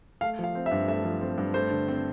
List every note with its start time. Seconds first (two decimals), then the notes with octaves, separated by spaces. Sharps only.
0.21 A3 F5
0.39 F3 F5
0.55 C4
0.66 E5
0.71 G2
0.88 A3 E5
1.05 F3
1.21 C4
1.38 G2
1.54 A3 C5
1.71 D3
1.88 C4